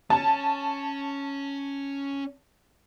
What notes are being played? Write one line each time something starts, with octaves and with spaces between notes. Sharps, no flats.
C#4 A5